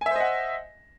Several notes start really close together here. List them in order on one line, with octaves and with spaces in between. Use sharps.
G#5 E5 C5 D#5 F#5